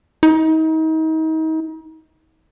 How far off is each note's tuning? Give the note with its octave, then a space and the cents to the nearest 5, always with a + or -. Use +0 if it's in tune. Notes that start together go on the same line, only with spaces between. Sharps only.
D#4 +35